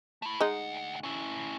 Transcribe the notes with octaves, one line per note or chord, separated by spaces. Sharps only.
A3 E4
D2 G#3 D#4 F#5
C#4 E4